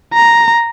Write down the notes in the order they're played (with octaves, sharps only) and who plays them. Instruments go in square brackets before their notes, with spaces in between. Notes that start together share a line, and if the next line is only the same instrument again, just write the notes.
[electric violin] A#5